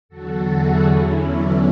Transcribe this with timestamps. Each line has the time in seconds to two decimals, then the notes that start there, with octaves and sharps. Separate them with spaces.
0.09 E2 D3 F#3 F#4 A4
0.45 E4 G#4
0.83 E2 D3 F#3 C#4 E4
1.20 B3 D4